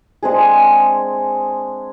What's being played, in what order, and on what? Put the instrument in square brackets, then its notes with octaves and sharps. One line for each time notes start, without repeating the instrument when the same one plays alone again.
[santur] G#3 C4 D4 G#4